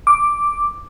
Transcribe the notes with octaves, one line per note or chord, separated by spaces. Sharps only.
D6